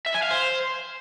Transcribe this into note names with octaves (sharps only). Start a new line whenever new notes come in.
E5
G#5
F5
C5